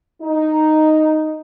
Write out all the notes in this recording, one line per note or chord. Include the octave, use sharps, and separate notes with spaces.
D#4